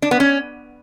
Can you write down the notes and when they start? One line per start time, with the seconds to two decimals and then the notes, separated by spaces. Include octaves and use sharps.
0.02 D4
0.11 B3
0.20 C#4